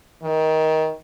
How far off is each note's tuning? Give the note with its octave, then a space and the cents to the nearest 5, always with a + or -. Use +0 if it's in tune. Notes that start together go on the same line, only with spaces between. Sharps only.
D#3 +20